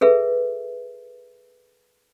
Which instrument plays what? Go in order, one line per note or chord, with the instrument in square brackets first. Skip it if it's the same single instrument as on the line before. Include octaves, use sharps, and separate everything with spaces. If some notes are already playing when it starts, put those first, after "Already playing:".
[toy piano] G#4 A4 B4 E5